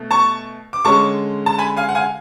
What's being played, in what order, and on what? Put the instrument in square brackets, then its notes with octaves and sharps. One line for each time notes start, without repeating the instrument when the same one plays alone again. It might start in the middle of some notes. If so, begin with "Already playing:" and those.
Already playing: [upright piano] B2 A3
A5 C#6
D6
D3 G#3 C#4 A5 C#6
A5
G#5 B5
F5 G#5
F#5
F5 G#5